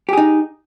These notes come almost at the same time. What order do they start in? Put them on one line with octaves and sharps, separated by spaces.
G4 G#4 D#4